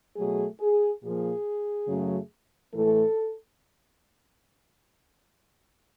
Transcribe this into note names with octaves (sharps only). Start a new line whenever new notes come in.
B2 F#3 A3 G#4
G#4
A#2 F3 A#3 G#4
F#2 C#3 F#3 A3
A2 E3 A3 A4